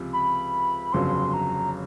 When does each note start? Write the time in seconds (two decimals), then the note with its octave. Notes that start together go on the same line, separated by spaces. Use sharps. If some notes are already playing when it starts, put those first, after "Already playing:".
Already playing: C#2 C3 F3
0.13 B5
0.93 G1 F2 C#3 F#3 C6
1.34 A#5